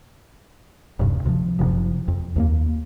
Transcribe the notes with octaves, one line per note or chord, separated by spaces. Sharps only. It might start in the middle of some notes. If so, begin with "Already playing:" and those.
D#1 G2 C3
D2 C3 E3 F3
F#1 C3 F3
F2
D#2 A3 A#3